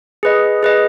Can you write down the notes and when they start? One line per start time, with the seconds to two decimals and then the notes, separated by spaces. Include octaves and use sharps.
0.23 G#4 B4 D#5
0.63 G#4 B4 D#5